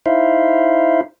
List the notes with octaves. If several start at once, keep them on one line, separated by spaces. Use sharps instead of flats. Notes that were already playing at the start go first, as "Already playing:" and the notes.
D#4 E4 C5 E5 F5